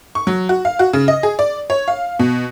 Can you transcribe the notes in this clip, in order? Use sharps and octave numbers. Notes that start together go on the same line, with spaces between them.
C#6
F#3
F#4
F5
F#4
C#3
D#5
G#4
D5
C#5
F5
B2